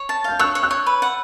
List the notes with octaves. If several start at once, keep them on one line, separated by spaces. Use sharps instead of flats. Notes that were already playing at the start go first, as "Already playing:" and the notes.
Already playing: C#5
A5
F5 G6
C#5 E6 F#6
C#5
E6 F#6
C#5
B4
F#5